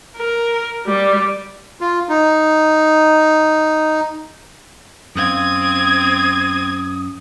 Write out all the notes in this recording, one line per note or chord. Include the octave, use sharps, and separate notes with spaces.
A#4
G3
F4
D#4
F#2 C4 F5 D#6 G#6